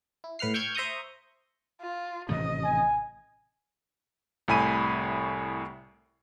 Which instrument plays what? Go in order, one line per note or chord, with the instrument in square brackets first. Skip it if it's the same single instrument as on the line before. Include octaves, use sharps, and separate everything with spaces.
[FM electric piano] E4
A2 B4 F#5 F6 C7
G5 C#6 E6 F6 G6 G#6
C5 E5 A#5 C#6 D#6 G6
[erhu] F4
[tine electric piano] A1 [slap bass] C3 D#3 A3 [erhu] D#5
[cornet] G#5
[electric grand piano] C2 A2 G#5 B5 D#7